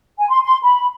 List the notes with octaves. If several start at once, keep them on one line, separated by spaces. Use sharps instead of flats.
G#5
C6
C6
B5